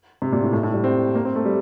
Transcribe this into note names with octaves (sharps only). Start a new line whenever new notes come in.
C3
A#2
A2
A2
A2
G3
C4
A#3
C4
A3
G3